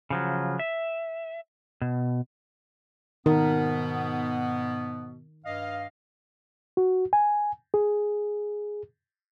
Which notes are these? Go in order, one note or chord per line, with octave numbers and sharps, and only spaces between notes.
C#3 F3 F#3
E5
B2
G#2 B2 D#3 B3 D#4 A#4
G2 D#5 F5
F#4
G#5
G#4